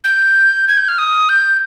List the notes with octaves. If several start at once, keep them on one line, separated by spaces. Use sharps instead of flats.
G6
G#6
G6
F6
D#6
G6